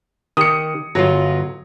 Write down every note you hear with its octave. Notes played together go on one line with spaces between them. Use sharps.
D#3 G4 D#6 C#7
G1 F#3 F4